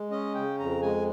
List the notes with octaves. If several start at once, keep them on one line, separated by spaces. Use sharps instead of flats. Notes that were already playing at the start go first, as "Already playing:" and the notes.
Already playing: G#3
C#4 D#5
C#3 G5
F2 A#5
G#3 G#5